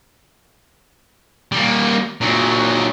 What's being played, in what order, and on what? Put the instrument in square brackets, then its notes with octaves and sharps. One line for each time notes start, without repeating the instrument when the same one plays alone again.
[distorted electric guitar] G3 A#3
A#2 F#3